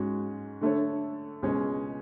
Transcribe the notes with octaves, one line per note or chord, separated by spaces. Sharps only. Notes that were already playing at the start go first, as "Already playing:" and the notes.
Already playing: G#2 G#3 C#4 F#4
D3 A3 D4 A4 C#5
C#2 B2 G#3 C#4